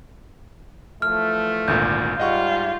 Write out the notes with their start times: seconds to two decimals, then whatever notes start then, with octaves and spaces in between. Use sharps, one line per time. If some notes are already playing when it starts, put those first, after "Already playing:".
1.02 E3 F3 A3 F6
1.68 G#1 D2 A#2 G6
2.20 G#2 G3 F4 D#5 F#5 C#6